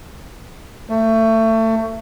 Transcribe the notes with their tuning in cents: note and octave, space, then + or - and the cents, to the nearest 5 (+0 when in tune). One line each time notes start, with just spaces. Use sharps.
A3 +25